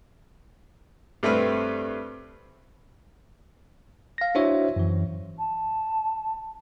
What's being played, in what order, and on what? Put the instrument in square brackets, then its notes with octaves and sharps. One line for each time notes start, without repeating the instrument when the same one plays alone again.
[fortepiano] G2 A3 C4 B4 F6
[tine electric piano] F5 A#6
D4 E4 F#4 C5 C#5 E5
F#2 E3
[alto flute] A5